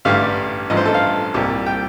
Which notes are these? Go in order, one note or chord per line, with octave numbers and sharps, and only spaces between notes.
A1 G2 D3 G3 F5
A1 G2 F3 D#5
C5
A4
F5
C2 A#2 G3
G5